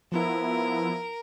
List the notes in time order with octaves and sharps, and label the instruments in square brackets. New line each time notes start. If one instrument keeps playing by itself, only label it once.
[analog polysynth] F3 B3 E4 [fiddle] A#4